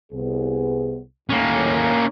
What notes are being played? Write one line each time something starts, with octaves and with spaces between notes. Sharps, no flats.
C2 B3 G#4
D#2 A2 A#3 C#4